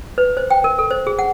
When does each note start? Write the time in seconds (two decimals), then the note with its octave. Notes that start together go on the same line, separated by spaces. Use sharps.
0.18 B4
0.37 C5
0.51 G5
0.64 A#4
0.79 A4
0.91 C5
1.07 G#4
1.19 F#5